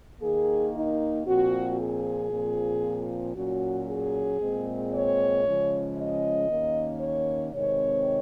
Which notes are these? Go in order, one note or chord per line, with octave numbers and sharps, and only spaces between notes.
D#2 D#3 A#3 G#4
D#4
A#2 F3 C4 F#4
G#4
A#2 F3 C4
A#2 F#3 C#4 F#4
G#4
A#2 G#3 C4
C#5
C#3 F3 G#3 C#4
D#5
D#2 D#3 A#3 C#4
C#5
C3 D#3 G#3 C4 C#5